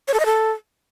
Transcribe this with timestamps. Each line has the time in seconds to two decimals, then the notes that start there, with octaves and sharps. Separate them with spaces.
0.08 C#5
0.14 A4
0.20 D#5
0.26 A4